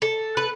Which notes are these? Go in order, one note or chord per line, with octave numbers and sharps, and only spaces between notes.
A4
B4